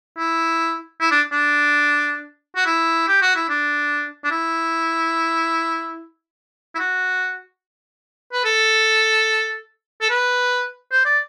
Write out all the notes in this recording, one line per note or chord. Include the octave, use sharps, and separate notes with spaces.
E4
E4
D4
D4
F#4
E4
G4
F#4
E4
D4
D4
E4
E4
F#4
B4
A4
A4
B4
C5
D5